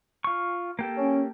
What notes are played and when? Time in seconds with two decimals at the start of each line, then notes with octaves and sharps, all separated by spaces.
0.24 F4 C#6
0.79 A#3 G4 A4
0.98 C#4